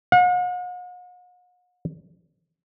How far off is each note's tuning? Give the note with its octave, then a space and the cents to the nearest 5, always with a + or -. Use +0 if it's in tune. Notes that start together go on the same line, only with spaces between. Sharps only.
F#5 -45